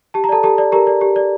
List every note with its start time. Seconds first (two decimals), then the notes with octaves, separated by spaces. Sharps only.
0.14 G4 A5
0.24 A#5
0.29 A4 D5 A5
0.43 G4 A4 A5
0.58 D5
0.72 G4 A#4 A#5
0.87 D5
1.01 G4
1.16 D5